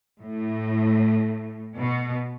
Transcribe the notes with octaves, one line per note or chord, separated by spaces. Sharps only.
A2
B2